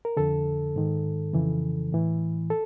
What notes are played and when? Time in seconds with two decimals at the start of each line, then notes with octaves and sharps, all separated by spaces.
0.05 A#4
0.17 F2 D3 A4
0.76 G#2 D#3
1.34 F2 C#3 E3
1.93 A2 E3
2.50 A4